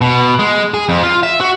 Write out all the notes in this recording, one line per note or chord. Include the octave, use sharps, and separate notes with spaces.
B2
G#3
G#4
F2
F4
E5
F#4